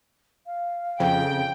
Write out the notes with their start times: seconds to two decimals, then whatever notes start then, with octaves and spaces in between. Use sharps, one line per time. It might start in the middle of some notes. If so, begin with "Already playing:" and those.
0.46 F5
1.00 F2 C#3 G5